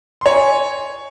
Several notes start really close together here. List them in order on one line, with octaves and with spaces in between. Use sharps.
C6 C#5 G#5